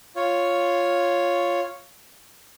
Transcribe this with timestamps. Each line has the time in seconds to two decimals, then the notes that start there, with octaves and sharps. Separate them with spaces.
0.16 F4 C#5